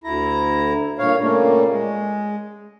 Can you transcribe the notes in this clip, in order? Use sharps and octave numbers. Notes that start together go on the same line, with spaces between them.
D2 E4 A#5
G2 A#2 C#5 F5
A#2 C#3 G3 A3 A#3
G#3